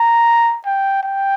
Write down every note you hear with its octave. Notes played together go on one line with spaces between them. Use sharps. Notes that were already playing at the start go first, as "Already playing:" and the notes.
Already playing: A#5
G5
G5